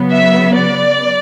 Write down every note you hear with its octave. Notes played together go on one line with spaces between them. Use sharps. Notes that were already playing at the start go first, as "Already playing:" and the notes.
Already playing: C#3 F#3 B3
E5
D5